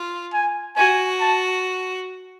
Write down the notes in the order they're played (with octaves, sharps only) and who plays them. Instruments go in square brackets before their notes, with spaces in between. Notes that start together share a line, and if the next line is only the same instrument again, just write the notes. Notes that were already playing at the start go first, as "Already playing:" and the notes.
Already playing: [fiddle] F4
[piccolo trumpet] G#5
[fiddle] F#4 [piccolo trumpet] G#5
[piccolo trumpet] A5